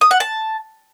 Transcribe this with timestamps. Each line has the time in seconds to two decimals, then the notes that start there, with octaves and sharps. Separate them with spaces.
0.01 D#6
0.11 F#5
0.20 A5